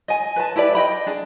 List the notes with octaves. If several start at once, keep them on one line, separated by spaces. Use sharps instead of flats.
D#5 G#5
B4 G#5 A5
E4 G4 B4 D5
D#5 G5 B5
D4 G#4